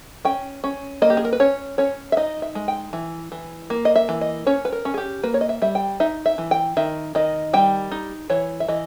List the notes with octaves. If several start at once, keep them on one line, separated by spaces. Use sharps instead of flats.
C#4 G5
C#4
A#3 D#5
G4
G#4
A#4
B4
C#4 C#5
C#4 C#5
E5
D#4 D#5
E5
G#3
G5
E3
E3
A#3
D#5
E5
E3
D#5
C#4 C#5
B4
A#4
C#4
G#4
G4
A#3 B4
C#5
D#5
E5
G3 E5
G5
D#4 E5
E5
E3
G5
D#3 E5
D#3 D#5
G3 G5
D#4
E3 C#5
E5
E3 D#5